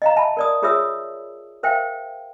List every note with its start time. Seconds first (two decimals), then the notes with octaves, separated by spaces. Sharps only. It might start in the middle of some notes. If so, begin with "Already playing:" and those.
0.02 D#5 F5 A#5
0.16 E5 A5 B5
0.37 A#4 D5 D#6
0.62 F4 G#4 C#5 E5 D#6 E6
1.63 A#4 C5 E5 F5 G5